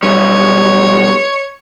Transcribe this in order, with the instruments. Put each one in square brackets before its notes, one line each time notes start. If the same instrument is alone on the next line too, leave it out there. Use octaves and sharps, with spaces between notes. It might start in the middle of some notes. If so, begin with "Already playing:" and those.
[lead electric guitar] B1 G3 [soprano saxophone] C#5